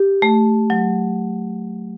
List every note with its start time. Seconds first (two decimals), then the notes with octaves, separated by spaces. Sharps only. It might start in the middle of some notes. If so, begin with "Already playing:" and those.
Already playing: G4
0.22 A3
0.70 F#3